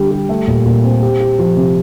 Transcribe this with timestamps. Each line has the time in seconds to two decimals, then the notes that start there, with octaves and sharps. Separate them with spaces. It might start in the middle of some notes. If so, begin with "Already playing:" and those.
Already playing: D3 G3 G4
0.11 G4
0.29 A3
0.47 A#2
0.66 A#2
0.84 C4
1.03 G4
1.20 G4
1.39 F3
1.57 C3